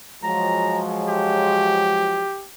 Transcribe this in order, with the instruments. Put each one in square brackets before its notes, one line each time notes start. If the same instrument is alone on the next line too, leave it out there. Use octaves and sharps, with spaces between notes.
[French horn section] F3 F#3 G#3 [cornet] A#5
[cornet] G4